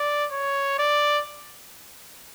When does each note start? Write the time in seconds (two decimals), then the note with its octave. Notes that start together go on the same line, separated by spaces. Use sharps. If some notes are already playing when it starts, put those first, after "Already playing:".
Already playing: D5
0.32 C#5
0.79 D5